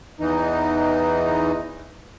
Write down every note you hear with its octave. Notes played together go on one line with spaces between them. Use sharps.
E2 E3 D#4